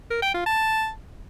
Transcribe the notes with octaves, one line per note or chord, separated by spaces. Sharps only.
A#4
G5
F4
A5